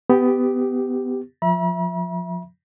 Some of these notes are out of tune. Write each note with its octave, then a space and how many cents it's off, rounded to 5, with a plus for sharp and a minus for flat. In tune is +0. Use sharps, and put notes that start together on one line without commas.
B3 +20 G4 +0
F3 +20 E5 +0 B5 -45